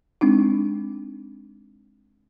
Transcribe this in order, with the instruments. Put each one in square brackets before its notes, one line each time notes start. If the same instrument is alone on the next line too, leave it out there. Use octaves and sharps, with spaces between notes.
[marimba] G#3 C4 D4 D#4